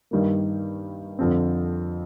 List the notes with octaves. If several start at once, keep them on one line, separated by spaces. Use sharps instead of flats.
G2 D#3 G3 A#3
F2 D3 F3 C4